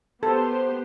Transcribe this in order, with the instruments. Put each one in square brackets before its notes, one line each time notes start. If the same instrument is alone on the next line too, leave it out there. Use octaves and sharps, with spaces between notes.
[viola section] B3 G4 C5 [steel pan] A4